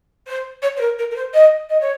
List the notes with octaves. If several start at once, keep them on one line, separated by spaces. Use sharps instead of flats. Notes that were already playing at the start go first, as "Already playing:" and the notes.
C5
C#5
C5
A#4
A#4
A#4
C5
D#5
D#5
C#5